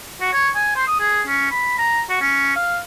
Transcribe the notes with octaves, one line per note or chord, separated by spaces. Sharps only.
F#4
C#5
G#5
C5
D#6
G#4
C#4
B5
A#5
F#4
C#4
F5